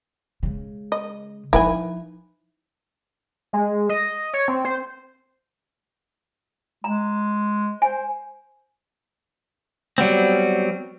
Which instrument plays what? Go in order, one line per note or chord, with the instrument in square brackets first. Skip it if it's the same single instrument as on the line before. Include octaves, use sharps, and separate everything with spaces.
[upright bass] C#3 G#3
[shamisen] D#5
[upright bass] F3 D#4 [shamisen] E4 B4 G#5
[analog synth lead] G#3
D#5
C#5
C4
C5
[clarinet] G#3 [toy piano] A#5
[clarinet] C5 [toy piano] G#5
[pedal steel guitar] F#3 G3 B3 C4